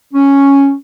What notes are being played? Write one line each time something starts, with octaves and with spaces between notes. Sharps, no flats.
C#4